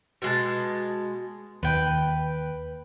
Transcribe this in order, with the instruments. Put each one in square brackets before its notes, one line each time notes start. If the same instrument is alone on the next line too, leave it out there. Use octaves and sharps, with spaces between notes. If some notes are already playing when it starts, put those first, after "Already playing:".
[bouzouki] B2 G#3 A5
[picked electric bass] D#2 [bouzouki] B4 G5